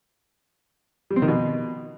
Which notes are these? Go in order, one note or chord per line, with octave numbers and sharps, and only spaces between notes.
G3
C4
D#3
B2